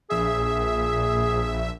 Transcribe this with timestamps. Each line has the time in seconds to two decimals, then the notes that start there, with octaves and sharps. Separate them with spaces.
0.10 A#1 G#4 E5